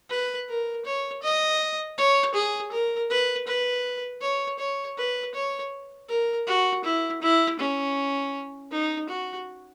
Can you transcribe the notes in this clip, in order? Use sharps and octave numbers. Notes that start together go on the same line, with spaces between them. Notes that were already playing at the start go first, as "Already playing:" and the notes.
B4
A#4
C#5
D#5
C#5
G#4
A#4
B4
B4
C#5
C#5
B4
C#5
A#4
F#4
E4
E4
C#4
D#4
F#4